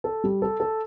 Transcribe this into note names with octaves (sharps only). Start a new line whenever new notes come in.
A4
G3
A4
A4